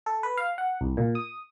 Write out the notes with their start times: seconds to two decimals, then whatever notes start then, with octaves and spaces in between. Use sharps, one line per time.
0.06 A4
0.23 B4
0.37 F5
0.58 F#5
0.81 C2
0.97 A#2
1.15 D#6